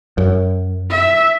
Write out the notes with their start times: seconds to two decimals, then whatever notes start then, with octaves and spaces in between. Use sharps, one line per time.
0.18 F#2
0.91 E5